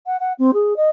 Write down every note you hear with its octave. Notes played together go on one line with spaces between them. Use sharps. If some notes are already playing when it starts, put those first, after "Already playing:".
F#5
F#5
C4
G#4
D#5